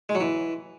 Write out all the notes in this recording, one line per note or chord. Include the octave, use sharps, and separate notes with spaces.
G#3
F#3
E3